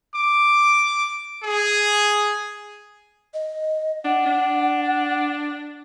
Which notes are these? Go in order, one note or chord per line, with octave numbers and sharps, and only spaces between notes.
D6
G#4
D#5
D4 F#5
D4